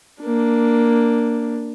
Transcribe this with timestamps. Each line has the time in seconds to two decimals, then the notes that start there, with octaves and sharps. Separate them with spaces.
0.23 A#3 D4